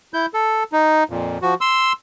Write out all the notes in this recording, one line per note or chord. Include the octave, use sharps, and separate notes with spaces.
E4 G6
A4
D#4
F2 A#2
F3 F#4
C6 E6